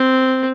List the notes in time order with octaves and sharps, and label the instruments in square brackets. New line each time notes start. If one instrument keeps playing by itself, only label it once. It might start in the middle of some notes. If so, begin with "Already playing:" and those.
Already playing: [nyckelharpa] C4